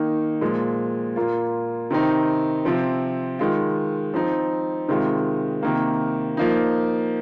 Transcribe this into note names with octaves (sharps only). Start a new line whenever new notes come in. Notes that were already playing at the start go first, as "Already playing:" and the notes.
Already playing: D#3 A#3 D#4
A#2 F3 G#3
A#2 A#3 F4
C3 D#3 C4 D#4
C3 F3 C4
D#3 G#3 F4
F3 C4 D#4
C3 D#3 G#3 F4
C3 D#3 A#3
F3 A#3 D#4